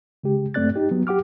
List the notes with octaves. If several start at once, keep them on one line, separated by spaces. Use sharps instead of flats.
C#3 G#3 G4
F#2 A3 C4 D5 F#6 A6
D#4 G4
F#3 B3
G4 F#5 D6 F6